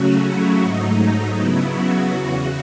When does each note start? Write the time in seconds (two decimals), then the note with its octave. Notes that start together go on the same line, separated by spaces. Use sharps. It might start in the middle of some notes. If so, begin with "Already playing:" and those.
Already playing: C#3 F#3 A3 C#4 F#4
0.25 E4
0.61 G#2 F#3 A3 D#4
1.36 C#3 F#3 B3 E4
1.74 F#4
2.11 E2 C#3 E3 F#4